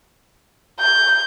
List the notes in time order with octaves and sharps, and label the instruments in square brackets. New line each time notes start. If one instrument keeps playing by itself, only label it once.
[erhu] G6